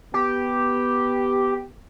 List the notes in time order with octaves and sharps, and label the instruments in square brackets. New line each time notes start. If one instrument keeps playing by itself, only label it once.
[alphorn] B3 [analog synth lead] G4